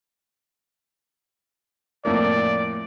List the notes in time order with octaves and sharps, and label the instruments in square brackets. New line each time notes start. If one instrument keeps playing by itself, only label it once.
[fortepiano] F2 A2 A#3 [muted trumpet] D5